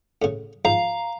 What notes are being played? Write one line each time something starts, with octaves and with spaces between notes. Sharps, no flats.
A2 C#3
G#2 F3 F5 A#5